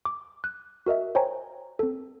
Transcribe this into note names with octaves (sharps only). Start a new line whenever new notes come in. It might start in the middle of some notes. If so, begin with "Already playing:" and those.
D6
F#6
F#4 A#4 D#5 E5
C5 C#5 G5 G#5 A#5
C4 A4